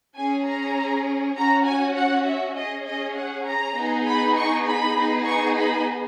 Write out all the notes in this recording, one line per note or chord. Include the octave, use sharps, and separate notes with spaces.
C#4 G#4 G#5
A#5
C#4 F#4 A#5
G#5
F#5
E5
C#4 G#4 D#5
D#5
F#5
A#5
B3 D#4 G#4
B5
C#6
B5
B3 D#4 G#4
C#6
B5